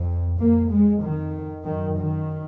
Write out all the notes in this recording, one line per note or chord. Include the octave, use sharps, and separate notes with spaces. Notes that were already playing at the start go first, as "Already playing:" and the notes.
Already playing: F2
F2 A#3
G#3
F2 D#3
F#2 D#3
D#3